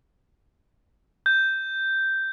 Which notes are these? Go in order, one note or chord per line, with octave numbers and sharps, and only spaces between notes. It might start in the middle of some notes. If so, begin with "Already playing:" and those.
G6